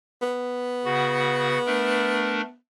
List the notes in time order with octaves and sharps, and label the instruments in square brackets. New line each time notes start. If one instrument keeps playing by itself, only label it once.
[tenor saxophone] B3
[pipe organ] C#3 F#4 F#5
A3 D4 A#4